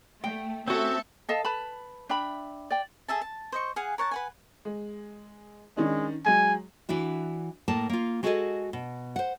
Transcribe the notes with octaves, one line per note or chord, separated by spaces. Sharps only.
A3 G5
A3 C4 C#4 F#4 A4 E5
A4 D#5 F5 A5
B4 A5 B5
D4 E5 G5 B5
D5 G5
G#4 A4 E5 A5
A5
C5 D#5 C#6
G#4 F5 F#5 G#5
A#4 C#5 F#5 A5
B4 F#5 G#5
G#3
D#3 G#3 C#4 D4
F#3 G#3 G#5
E3 D4 E4 F#4
A2 A#3 A5
A#3 F4
G#3 F#4 G#4 A4 D#5 G#5
B2
C5 F#5